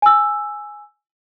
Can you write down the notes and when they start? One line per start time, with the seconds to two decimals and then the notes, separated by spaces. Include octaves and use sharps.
0.02 G#5 E6